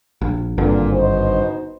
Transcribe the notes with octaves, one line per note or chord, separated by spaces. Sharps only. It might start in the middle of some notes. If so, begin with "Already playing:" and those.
A#1
G#1 G2 A#2 D3
B2 D#4 C5